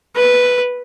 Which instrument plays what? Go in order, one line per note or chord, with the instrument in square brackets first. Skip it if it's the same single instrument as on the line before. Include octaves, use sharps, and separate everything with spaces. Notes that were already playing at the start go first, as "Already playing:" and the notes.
[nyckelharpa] B4